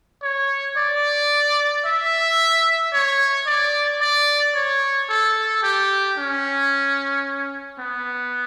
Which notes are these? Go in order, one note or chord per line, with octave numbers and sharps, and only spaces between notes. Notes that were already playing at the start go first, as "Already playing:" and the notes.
C#5
D5
E5
C#5
D5
D5
C#5
A4
G4
C#4
B3